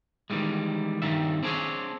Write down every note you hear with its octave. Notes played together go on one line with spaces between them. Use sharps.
D#3 E3 G3 G#3
G2 D#3 G3 E5
C4 D4 E4 F4 G#4 C#5